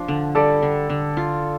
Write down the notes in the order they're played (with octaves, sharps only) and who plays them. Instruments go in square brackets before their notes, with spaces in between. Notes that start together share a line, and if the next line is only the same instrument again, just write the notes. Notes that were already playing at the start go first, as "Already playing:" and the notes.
Already playing: [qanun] F3 D4
D3
[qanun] G3 [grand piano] A4 D5
[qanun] D3
D3
F4